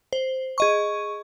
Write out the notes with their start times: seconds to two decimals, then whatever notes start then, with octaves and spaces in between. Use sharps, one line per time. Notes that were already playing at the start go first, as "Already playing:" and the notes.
0.13 C5
0.58 G#4 D#5 C#6